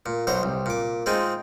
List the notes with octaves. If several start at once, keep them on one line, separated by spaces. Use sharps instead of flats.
A#2
B1 F#3 C5 A#5
C2
A#2 D6
G#3 C4 D#4 F4 G#4